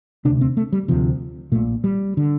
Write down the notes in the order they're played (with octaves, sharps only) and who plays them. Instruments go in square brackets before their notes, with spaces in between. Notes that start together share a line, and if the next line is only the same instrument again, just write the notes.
[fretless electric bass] E1 D2 C3 D4
C4
A3
G3
D2 C3 F3
A#1 A#2 A3
G3
D3